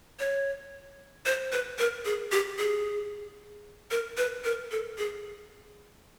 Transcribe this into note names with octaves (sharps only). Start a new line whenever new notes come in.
C#5
C5
B4
A#4
G#4
G4
G#4
A#4
B4
A#4
A4
G#4